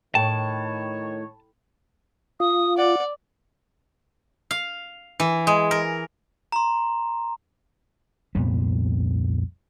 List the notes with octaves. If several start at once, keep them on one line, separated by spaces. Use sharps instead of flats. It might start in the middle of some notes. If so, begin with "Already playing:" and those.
A2 D#3 C#5 G5 A5
F4 D#6
D5 F#5
F5
E3
G#3
A#4
A#5 C6
C2 F2 A#2 B3